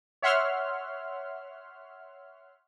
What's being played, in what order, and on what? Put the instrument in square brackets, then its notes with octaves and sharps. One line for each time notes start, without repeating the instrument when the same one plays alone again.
[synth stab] C#5 E5 F#5 C6 F6